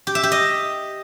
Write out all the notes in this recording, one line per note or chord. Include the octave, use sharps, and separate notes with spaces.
G4
E5
G4
D#5